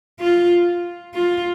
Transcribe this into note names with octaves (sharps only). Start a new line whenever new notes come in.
F4
F4